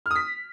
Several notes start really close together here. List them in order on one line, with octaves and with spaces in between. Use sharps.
F6 D#6 B6